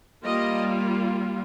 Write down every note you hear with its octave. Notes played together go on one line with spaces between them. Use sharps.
G3 A#3 F4 D#5